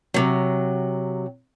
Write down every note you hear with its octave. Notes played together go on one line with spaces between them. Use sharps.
C3 F#3